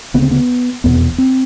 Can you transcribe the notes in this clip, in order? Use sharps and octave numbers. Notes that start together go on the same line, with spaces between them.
D2 C#3 B3
C4
B3
F1 E2 B2 B3
C4